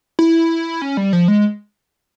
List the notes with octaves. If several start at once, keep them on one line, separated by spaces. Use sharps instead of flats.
E4
C#4
G3
F3
G#3